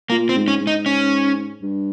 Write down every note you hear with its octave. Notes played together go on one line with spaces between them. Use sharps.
A#2 A#3
C4
G#2
C#4
G#2
D#4
C#4
G2